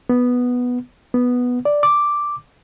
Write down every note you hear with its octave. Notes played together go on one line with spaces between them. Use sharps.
B3
B3
D5
D6